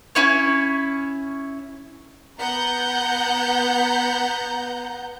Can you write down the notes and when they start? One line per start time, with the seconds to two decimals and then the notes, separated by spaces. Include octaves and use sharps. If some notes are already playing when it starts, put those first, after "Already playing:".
0.15 C#4 E4 C#5
2.39 B3 F#5 A#5 G6